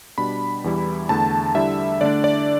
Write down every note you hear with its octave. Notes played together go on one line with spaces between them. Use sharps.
B2 G3 D4 B5
E2 E3 G3 E4
E2 D3 A3 A5
D3 G3 E4 E5
D3 A3 D4 D5
D5